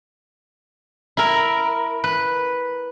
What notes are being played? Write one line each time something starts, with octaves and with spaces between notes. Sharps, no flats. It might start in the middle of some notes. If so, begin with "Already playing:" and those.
E4 A#4
B4